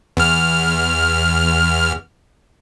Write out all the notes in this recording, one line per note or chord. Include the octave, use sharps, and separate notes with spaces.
E2 F6